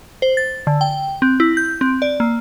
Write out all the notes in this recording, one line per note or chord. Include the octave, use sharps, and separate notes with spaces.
C5
A6
D3
G5
C4
E4
G6
C4
D5
A#3